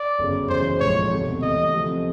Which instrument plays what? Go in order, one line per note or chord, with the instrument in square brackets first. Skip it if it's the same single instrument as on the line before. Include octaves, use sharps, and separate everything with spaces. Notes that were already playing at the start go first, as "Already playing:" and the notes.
Already playing: [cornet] D5
[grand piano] G1 F#2 C#3
[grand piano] G1 F#2 C#3 E3 [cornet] C5
[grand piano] A#1 G#2 F3 A3 [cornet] C#5
[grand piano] E1 D2 C3
[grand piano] D2 C3 E3 G3 [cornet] D#5
[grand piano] D2 C3 F3 A3